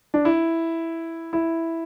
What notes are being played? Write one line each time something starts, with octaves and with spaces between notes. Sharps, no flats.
D4
E4
E4